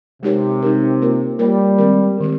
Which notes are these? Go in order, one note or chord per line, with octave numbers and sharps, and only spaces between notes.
C3 G#3 D#4 G4 A#4 C#5
G#3 D#4 G4 A#4 C#5
A#3 F4 A#4 C#5
G3 A#3 F4 A#4 C#5
D#3 G#3 C4 G4 A#4
D#3 G#3 C4 G4 A#4